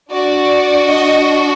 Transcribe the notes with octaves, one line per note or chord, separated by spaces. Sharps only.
D4 F#4 D5
D#5